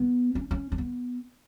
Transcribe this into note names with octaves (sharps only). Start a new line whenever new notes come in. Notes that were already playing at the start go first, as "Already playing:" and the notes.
Already playing: B3
C#4
C#4
C#4
B3